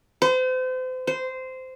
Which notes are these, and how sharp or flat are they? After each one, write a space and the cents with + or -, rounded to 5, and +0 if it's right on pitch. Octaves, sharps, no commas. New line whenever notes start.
C5 -35
C5 -15